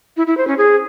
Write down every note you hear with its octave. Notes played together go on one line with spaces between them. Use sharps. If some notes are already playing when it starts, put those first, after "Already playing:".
E4
E4
C5
C#4
G#4